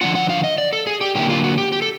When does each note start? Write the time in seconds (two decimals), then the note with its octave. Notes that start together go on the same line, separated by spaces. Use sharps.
0.01 D3 F3 A#3 D4 F4 F#5
0.15 F#5
0.30 F5
0.44 D#5
0.58 D5
0.73 A4
0.87 G#4
1.01 G4
1.15 D3 F#3 A#3 C#4 E4 G4
1.30 F4
1.44 F#4
1.58 G4
1.72 G4
1.82 A4